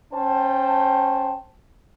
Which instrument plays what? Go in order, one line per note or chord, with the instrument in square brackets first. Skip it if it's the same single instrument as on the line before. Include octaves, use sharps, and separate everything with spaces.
[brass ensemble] C#4 C5 G5 A5